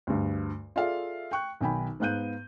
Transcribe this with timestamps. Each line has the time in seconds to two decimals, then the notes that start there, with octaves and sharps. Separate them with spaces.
0.07 D2 G2
0.76 F4 G#4 A4 D5 E5 F5
1.31 G5 C#6 F#6
1.61 B1 D#3 G5 G#5 B5
2.00 G#2 B3 F5 F#6 G6 D#7